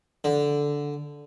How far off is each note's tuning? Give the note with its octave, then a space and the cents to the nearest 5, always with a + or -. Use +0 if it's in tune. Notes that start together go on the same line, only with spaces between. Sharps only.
D3 -10